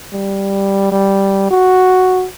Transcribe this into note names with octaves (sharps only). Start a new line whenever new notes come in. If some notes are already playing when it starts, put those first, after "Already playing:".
G3
G3
F#4